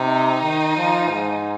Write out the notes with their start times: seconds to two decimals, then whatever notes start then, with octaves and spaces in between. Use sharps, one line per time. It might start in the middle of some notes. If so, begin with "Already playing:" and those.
Already playing: C3 D#4
0.43 D#3
0.76 F3
1.09 G#2